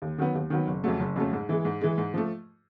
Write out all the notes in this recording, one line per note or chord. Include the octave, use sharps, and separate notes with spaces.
D#2
D#3 F#3 B3
D#2
D#3 F#3 B3
F#1
F2 C#3 F#3 A3
F#1
F2 C#3 F#3 A3
G#2
E3 G#3
G#2
E3 G#3
G#2
F3 A3